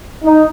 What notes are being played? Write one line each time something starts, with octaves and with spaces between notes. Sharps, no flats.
D#4